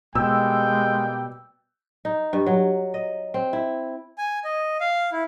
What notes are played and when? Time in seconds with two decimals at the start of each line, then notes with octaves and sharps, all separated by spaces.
0.15 B2 G3 G#3 A#3 G5 E6
2.05 D#4
2.33 G2
2.46 F#3
2.94 D#5
3.34 C4
3.53 E4
4.18 G#5
4.44 D#5
4.81 F5
5.12 E4